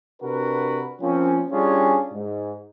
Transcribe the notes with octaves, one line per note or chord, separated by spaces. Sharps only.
C3 D4 F#4 A#4 B4
F3 A#3 C4 C#4
G3 C#4 D4 F4 F#4 G#4
G#2